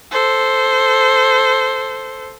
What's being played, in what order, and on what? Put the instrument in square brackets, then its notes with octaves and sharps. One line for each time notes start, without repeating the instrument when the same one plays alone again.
[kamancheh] A4 C5